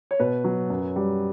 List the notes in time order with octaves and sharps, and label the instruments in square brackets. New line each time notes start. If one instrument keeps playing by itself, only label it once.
[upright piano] C#5
B2 B4
F#3
F#2
G3